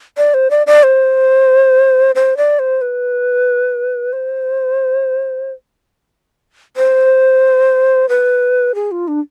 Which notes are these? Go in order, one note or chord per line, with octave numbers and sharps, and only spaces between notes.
D5
C5
D5
D5
C5
C5
D5
C5
B4
C5
C5
B4
G#4
F4
D4